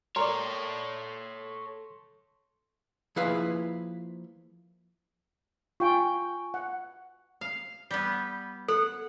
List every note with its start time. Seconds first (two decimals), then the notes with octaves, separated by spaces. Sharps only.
0.16 A4 A#4 C#5 D5 C6
3.16 F3 A#3 E4 G#4 B4 F5
5.80 F4 G5 G#5 C#6
6.54 F#5
7.41 F5
7.91 G3 B3
8.68 A4 F#5